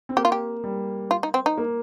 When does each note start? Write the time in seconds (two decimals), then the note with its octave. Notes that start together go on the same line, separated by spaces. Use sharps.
0.09 C4
0.17 A#3 G4
0.25 F4
0.32 G4
0.64 G3
1.11 F4
1.23 D#4
1.34 C4
1.46 D#4
1.57 A#3